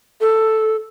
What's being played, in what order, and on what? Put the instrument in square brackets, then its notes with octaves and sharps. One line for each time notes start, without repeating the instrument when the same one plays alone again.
[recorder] A4